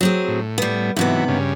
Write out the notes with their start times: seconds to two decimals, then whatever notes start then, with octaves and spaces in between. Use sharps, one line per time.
0.01 F#3 C4 G#4
0.28 A2
0.58 G3 B3
0.97 G#2 C3 E3 F#3 B3
1.28 G2 C#3